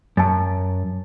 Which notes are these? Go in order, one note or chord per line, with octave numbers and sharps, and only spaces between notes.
F#2 A5 A6